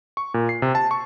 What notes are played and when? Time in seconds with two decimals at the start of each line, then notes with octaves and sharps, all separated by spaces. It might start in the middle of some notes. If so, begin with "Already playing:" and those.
0.17 C#6
0.34 A#2
0.49 C7
0.62 C3
0.75 A5
0.91 C#6